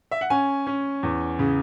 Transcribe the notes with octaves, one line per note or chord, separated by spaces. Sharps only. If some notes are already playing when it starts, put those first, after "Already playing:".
E5
F#5
C#4 G#5
C#4
E2
C#3